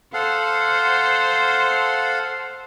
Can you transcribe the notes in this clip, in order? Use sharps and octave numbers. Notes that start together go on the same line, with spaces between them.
A4 C5 F5 F#5